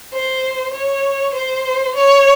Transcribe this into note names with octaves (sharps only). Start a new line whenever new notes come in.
C5
C#5
C5
C#5